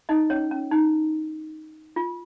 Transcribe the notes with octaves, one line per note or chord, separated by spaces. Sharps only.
D#4 D#5
C#4 C#5
C#4
D#4
F4